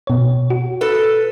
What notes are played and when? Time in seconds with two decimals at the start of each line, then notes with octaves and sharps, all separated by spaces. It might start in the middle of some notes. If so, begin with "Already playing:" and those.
0.07 B2 C#5
0.50 F#4
0.81 A4 B4